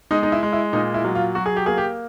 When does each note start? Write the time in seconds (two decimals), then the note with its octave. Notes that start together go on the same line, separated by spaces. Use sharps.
0.11 G#3 D#4
0.23 D#4
0.32 E4
0.43 G#3
0.53 E4
0.73 A#2 D#4
0.94 E4
1.05 F#3
1.15 F4
1.35 F#3 F#4
1.46 G#4
1.56 G4
1.66 A#3 G#4
1.78 G4